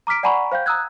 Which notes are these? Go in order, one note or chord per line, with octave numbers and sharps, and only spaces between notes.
A#5 D6 F6 B6 D7
D5 F#5 G#5 A#5 B5 C#6
C5 F5 G5 G6
A#5 D#6 E6 F#6 G#6